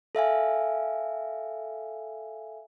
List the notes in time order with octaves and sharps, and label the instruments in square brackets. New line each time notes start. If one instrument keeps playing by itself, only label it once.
[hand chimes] A4 E5 F5 G#5